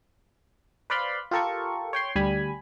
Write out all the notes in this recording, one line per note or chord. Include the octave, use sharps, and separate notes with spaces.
B4 C5 D5 F5 B5 C6
F4 G4 A4 A#4 C#6
C#5 G5 C6
D2 G3 G#5 B5